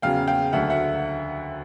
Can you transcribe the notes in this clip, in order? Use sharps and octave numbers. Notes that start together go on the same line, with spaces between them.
E2 C#3 F#3 F5 G5
F5 G5
D2 D3 F#3 E5 F#5
E5 F#5